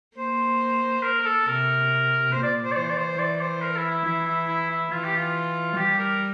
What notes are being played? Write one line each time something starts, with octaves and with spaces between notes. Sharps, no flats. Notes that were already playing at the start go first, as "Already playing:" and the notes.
A#3 C5
A#4
A#4
A4
C3 A#4
A#2 C5
D5
C5
D5
E3 C5
D5
C5
E3 D5
C5
A#4
E4
E4
E3 E4
E4
E4
E4
E3 F4
G4
F4
G3 G4
A#4